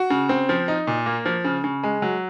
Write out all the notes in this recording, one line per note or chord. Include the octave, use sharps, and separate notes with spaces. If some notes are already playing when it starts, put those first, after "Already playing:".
Already playing: F#4
C#3
C4
F3
D#4
A#2
A#3
F3
C#3
C#3
G#3
F#3